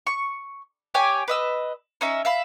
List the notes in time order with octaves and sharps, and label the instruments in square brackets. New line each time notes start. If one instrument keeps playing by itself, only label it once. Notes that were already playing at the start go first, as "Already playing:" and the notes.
[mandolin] C#6
G4 C#5 G5 G#5
B4 D#5 E6
C#4 D#4 E5
E5 F5 B5